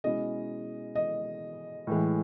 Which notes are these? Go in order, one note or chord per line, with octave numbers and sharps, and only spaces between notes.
B2 G#3 C#4 E4 D#5
D#5
A2 E3 G#3